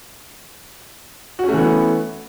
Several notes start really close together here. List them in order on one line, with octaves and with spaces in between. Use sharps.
F#4 C#4 A3 E3 B3